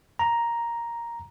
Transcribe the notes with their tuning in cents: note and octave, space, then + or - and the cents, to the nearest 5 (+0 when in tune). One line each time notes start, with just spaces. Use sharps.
A#5 +5